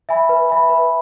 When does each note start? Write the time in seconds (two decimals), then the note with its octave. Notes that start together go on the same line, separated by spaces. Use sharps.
0.09 E5 G#5 B5
0.29 B4
0.49 E5 G#5 B5
0.70 B4